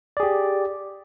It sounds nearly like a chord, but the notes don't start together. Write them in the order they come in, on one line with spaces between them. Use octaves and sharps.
D5 G#4 G4